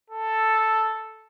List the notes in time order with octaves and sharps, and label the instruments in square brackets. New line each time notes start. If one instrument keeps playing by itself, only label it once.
[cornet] A4